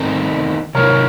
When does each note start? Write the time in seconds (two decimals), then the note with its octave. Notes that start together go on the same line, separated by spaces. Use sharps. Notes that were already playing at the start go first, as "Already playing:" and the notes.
Already playing: D#3 A3 C4 D#4 A#4
0.75 C3 D#3 F#3 A#3 A#4 C#5